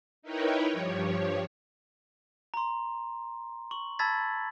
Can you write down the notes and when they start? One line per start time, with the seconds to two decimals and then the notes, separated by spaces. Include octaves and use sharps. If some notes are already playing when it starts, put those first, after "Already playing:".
0.22 D#4 E4 A#4 B4 C#5 G5
0.73 G2 F3 G3 C#5
2.54 A#5 C6
3.71 C#6 F#7
3.99 A5 B5 E6 G#6 A6 B6